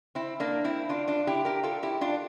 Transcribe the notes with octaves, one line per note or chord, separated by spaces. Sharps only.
C4 E4
A#3 D4
C4 E4
D4 F4
D4 F4
E4 G4
G4 A#4
F4 A4
E4 G4
D4 F4